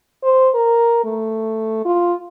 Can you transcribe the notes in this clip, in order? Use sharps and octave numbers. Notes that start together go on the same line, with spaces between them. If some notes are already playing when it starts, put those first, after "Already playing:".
C5
A#4
A3
F4